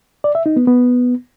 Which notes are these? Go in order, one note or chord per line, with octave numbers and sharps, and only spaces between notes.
D5
E5
D#4
B3
B3